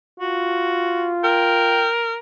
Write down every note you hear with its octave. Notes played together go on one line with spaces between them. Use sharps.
F4 F#4
A#4 G5